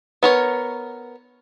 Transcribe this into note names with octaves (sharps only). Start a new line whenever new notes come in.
B3 A#4 C#5